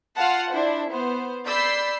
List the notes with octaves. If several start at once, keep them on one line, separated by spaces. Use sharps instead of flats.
F4 F5 F#5 A5
D4 E4 C5
B3 C5
D5 B5 E6 G6 B6 C7